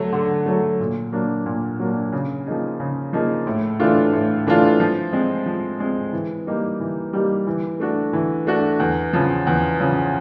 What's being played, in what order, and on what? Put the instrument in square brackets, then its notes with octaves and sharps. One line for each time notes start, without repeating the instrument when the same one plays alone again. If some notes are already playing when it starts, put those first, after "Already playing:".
Already playing: [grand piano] D3 F#3 A3
D3
F#3 A3
A#2
F#3 A#3 D4
A#2
F#3 A#3 D4
C#3
F3 A#3 D#4 G#4
C#3
F3 A#3 D#4 G#4
A2
E3 A3 D4 F4
A2
E3 A3 D4 F4
F3
G#3 C4
F3
G#3 C4
E3
G3 A#3 D#4 G4
E3
G3 A#3 D#4 G4
E3
A3 D4 F#4
E3
A3 D4 F#4
E2
C#3 F3
E2
C#3 F3